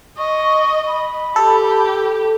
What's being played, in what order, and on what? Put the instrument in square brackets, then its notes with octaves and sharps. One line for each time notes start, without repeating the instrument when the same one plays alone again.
[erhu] D#5 [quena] C#6
[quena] B5
[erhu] G4 [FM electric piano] A4